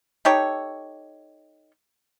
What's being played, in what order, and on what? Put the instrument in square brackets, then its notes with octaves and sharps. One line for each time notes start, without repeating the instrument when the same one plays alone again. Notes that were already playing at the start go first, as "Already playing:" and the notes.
[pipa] D#4 G4 A4 C#5